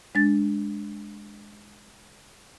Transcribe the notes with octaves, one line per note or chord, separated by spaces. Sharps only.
G#3 D4 A6